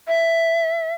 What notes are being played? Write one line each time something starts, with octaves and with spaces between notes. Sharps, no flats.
E5